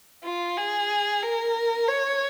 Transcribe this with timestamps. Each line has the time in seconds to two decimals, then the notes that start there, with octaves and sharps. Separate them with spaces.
0.24 F4
0.57 G#4
1.23 A#4
1.88 C#5